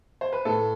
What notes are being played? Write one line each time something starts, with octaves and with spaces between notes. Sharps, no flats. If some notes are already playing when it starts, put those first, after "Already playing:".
C5
B4
A2 A4